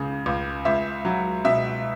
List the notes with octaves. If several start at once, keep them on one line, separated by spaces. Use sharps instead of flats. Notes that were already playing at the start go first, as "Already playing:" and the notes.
Already playing: C#2 C#3
C#2
C#2 E5
F#3
B2 E5